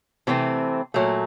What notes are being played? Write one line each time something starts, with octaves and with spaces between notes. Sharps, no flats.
C3 E3 A3 C4
A#2 F#3 A3